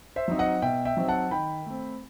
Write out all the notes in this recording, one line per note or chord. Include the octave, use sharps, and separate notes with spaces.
C5 E5
F#3 C4 D#4
D#5 F#5
B2 E5 G5
E5 G5
F#3 C4 D#4
F#5 A5
D#3 G5 B5
A3 C4